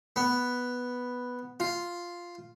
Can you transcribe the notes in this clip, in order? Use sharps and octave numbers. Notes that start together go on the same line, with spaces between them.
B3
F4